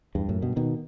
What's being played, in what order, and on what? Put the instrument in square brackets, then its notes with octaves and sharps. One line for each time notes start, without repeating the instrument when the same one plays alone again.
[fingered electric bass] E2 G2
F#2 A2
G2 B2
B2 D#3